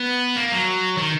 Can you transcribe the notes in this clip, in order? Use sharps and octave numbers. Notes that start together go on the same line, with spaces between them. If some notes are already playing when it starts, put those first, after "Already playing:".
Already playing: B3
A#3
F#3
D#3